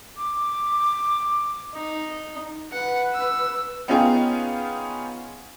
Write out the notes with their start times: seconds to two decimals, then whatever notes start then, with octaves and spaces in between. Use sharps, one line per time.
0.17 D6
1.75 D#4
2.73 B4 F#5
3.14 E6
3.88 B3 C#4 D#4 F4 G#4 G5